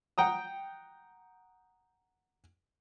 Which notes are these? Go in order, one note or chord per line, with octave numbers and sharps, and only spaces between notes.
F#5 G5 A#5 D#6